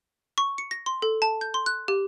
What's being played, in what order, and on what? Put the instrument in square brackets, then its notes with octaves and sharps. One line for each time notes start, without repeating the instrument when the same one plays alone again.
[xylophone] C#6
C#7
A#6
C6
A4
A5
G6
C6
F#6
G4